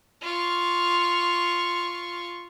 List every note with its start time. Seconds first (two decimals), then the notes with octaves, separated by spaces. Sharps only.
0.23 F4 C#6